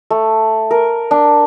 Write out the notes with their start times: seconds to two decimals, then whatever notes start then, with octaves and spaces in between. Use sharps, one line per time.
0.10 A3
0.71 A#4
1.11 D4